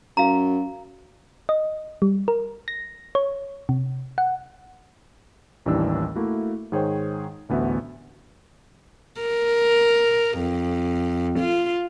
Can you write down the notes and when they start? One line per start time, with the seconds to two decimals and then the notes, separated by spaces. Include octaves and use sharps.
0.17 F#2 F5 A#5
1.49 D#5
2.02 G3
2.28 A#4
2.68 A#6
3.15 C#5
3.69 C3
4.18 F#5
5.66 A1 D#2 E3 G3 D4 E6
6.16 A3 A#3 E4 F#4
6.72 G#2 D#3 G#4 C5 C#5 G5
7.49 A1 D2 B3 F#4 E5
9.21 A#4
10.39 F2
11.39 F4